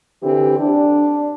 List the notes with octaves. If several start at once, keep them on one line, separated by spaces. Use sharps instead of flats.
D3 E3 C4 G4
D4